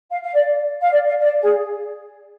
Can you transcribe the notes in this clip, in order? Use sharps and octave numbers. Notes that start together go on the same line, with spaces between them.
F5
F5
D5
F5
D5
F5
D5
G#4